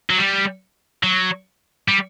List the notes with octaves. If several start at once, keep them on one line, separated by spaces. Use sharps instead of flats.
F#3
G3
F#3
G3